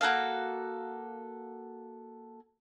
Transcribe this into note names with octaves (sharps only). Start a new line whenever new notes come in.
A#3 F#4 A4 F5